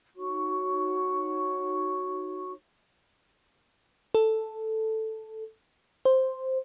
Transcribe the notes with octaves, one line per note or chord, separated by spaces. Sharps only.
D#4 F#4 C#5 C#6
A4
C5